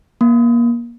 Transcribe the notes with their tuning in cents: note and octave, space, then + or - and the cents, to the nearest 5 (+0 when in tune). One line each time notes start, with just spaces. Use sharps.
A#3 +25